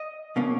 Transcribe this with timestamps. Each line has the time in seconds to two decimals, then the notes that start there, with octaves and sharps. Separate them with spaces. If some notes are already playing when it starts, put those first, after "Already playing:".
Already playing: D#5
0.36 B2 A#3 C#4